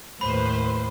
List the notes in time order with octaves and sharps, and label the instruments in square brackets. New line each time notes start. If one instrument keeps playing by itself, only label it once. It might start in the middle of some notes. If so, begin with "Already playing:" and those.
[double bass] D#2 A2 [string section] B4 C5 [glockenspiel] B5